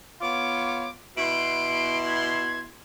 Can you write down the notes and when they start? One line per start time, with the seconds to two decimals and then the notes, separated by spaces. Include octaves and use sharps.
0.21 B3 F4 C#5 D6
1.17 B2 E4 C6 D7
2.06 G#6